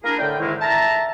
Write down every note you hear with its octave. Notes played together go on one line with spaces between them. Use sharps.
A#3 D4 E4 G#4 A#4
A2 D3 D5 G5
G#2 D3 D#3 G#3 A#3 E4
E5 A5 A#5